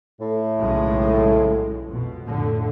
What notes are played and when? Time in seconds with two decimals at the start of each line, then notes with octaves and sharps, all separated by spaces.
0.19 A2
0.58 B1 C#3 G#3
1.85 F2 B2
2.26 F2 A2 D3